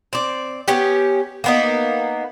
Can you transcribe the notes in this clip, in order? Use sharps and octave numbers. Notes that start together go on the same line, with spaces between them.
C4 D5
B3 C#4 G4
A#3 B3 D#4